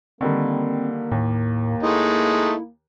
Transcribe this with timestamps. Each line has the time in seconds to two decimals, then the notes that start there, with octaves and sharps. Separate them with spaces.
0.21 D3 D#3 G3 A#3 C4
1.12 D#2 A2
1.83 G#3 A3 D#4 E4